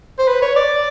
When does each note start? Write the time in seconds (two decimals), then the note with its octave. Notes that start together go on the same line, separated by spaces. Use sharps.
0.19 C5
0.28 B4
0.42 C#5
0.56 D5